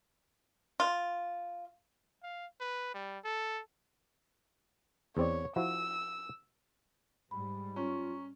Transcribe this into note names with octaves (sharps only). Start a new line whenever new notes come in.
F4
F5
B4
G3
A4
E2 C4 C#5 D5
F3 E4 F#4 E6
G#2 G3 B5
C#4 F4 A#5 C#6